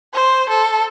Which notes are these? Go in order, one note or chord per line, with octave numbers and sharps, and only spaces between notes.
C5
A4